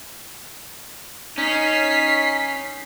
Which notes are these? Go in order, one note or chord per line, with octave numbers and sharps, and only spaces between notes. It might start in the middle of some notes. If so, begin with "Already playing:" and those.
C#4 D#4 B6 C7